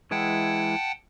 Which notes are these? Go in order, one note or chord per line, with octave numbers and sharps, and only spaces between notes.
E3 G#3 E4 F#5 G5 A5